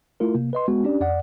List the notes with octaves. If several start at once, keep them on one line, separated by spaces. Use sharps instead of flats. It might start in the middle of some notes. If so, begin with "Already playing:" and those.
A3 E4 F4 A#4
C3 A#3
B4 D#5 C6
G#3 B3 F#4
C#4 D4 G4 D5
F2 D5 F#5